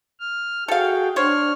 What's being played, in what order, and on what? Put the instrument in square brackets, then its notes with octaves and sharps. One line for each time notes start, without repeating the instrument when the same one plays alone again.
[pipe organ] F6
[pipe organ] F#4 G#4 G5 [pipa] A4 F5
[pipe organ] D4 F6 [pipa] C5 C#5